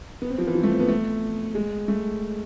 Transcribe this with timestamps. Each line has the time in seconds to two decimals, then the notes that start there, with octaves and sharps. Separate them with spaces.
0.22 B3
0.30 C4
0.38 F3
0.47 E3
0.55 F3
0.63 A3
0.71 C4
0.80 B3
0.88 A3
1.55 G#3
1.88 A3